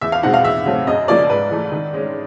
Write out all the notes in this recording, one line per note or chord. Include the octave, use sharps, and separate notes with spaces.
E2 E5
F5
B2 G#3 C4 D#4 F#5
F5
E2 E5
C#3 F#3 A3 C4
F#2 D#5
C#3 F3 A#3 D5
G#2 B4
E3 A3
D#3
G#3 C#4